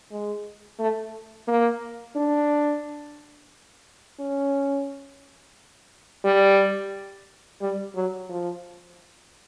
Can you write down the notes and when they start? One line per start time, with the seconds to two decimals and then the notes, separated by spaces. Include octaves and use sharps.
0.11 G#3
0.79 A3
1.48 A#3
2.16 D4
4.20 C#4
6.24 G3
7.62 G3
7.95 F#3
8.29 F3